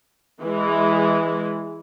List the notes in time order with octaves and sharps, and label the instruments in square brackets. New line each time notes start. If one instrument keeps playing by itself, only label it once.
[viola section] E3 G#3